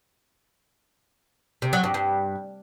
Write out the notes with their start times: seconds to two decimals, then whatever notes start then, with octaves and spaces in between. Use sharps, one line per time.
1.62 C3
1.73 F#3
1.84 G2
1.94 G2